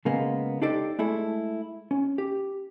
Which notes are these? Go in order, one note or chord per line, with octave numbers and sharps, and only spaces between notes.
C#3 G#3 A#3 B3
D4 D#4 G4 A4 C5 D5
G#3 A3 E4 G#4 A4
C#4
G4